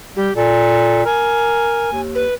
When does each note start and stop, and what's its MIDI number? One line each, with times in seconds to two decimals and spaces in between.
0.16 0.30 55
0.16 0.36 67
0.36 1.05 46
0.36 1.04 69
1.06 1.91 70
1.06 2.00 80
1.92 2.25 39
2.15 2.34 71